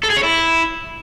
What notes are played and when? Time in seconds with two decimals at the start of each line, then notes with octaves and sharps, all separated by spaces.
0.04 A4
0.10 G#4
0.17 C#5
0.23 E4